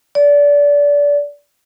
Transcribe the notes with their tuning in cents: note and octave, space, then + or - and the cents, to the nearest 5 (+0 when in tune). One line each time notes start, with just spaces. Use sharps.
D5 -25